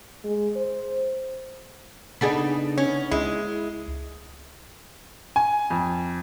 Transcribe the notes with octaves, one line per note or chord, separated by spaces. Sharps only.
G#3
C5
C#3 B3 D4 D#4 G#4 A4 B5
C#4 C#5
C#2 G#3 E4
G#5
F2